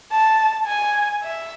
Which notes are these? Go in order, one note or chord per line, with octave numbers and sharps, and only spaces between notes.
A5
G#5
E5